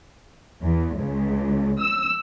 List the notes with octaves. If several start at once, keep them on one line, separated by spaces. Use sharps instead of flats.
E2
C#2
E6